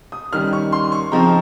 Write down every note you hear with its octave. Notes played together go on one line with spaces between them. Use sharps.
D#6
D#3 G3 C#4 F6
C#6
C6
C#6
C#3 F3 C4 D#4 A#5